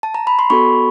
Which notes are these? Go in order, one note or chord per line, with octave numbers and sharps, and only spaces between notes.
A5
A#5
B5
C6
B3 D4 F#4 A4 B5 C#6